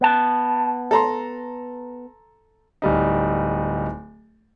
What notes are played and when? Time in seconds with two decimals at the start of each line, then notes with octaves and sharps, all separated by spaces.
0.01 B3 A5
0.91 A4 A#5 C6
2.82 D1 G3 D#4